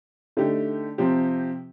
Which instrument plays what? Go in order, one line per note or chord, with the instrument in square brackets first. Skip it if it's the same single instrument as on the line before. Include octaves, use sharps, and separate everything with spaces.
[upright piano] D3 A3 D#4 G4
C3 F3 C4 G4